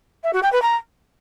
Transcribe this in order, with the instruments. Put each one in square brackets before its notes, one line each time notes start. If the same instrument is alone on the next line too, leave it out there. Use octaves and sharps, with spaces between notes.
[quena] E5
F#4
G5
B4
A#5